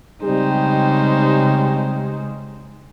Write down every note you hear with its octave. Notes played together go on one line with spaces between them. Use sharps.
C#3 G3 G#3 C4 D#4 G4 C5